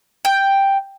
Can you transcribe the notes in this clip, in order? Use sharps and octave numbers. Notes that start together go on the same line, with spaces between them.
G5